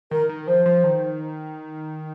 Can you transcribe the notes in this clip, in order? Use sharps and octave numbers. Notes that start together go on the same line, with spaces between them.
D#3 A#4
D#3
F3 C5
F3
D#3